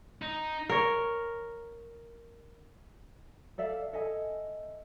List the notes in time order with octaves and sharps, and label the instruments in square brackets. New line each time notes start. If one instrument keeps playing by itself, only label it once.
[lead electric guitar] D#4
[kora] A#4 C#5
[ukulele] A4 D5 E5 F5
A4 D#5 E5 G#5